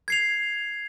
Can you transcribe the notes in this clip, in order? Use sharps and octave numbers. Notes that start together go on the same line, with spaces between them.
G#6 C7 F7